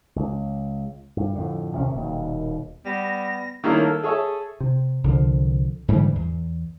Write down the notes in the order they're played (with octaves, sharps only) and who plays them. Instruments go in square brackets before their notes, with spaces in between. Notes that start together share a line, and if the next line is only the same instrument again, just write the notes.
[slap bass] C#2
G2
F2 A2 D3
D#2 C3 C#4
D#1 D#2 B2
[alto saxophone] G3 [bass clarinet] B3 [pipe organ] A#6
[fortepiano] D#3 G3 A3 A#3 C#4 E4
A4 A#4
G#4 A4 C#5 E5 A5
[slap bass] C3
C2 D3 F3
G#2 D3 E3 G3
E2